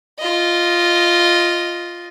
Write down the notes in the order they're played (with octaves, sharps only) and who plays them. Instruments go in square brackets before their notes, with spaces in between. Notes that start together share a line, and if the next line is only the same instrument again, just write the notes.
[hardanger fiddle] F4 D#5